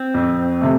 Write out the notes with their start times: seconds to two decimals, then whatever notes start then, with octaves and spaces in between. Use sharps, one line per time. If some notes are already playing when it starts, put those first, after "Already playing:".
Already playing: C4
0.14 F2
0.61 C3 A3